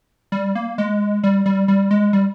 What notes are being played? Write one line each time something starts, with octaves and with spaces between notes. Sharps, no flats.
G3
A#3
G#3
G3
G3
G3
G#3
G3